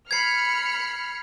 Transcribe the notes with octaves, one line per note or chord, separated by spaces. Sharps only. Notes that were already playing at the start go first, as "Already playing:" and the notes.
B5 F6 G#6 C7 C#7